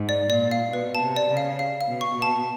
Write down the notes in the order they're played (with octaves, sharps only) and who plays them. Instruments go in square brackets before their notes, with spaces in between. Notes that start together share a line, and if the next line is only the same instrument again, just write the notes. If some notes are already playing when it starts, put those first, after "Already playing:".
Already playing: [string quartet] G#2
[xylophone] D5
[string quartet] A#2 [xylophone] D5
[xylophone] F5
[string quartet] B2 [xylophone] B4
[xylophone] A5
[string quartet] C3
[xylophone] D5
[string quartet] C#3
[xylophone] F5
F5
F5
[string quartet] B2
[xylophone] C#6
[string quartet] B2
[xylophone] A5